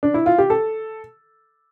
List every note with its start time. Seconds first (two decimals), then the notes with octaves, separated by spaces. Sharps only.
0.03 D4
0.14 E4
0.26 F4
0.38 G4
0.50 A4